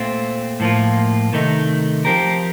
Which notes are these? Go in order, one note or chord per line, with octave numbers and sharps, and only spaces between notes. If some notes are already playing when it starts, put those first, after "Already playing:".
Already playing: A#2 A3 C4 F4
A2 F3 A#3 F4
C3 D#3 A3 D#4
F3 C4 G4 A#4